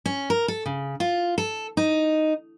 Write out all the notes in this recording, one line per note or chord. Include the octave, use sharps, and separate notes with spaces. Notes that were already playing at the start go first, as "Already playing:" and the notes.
C#4
A#4
A4
C#3
F4
A4
D#4